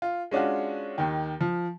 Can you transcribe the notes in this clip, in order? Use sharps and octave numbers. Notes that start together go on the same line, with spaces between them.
F4
G#3 C#4 D4 F4 F#4
D#2 D#3
F3